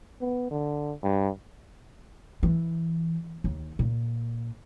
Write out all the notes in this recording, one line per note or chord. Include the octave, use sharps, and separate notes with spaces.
B3
D3
G2
E3
D#2
A#2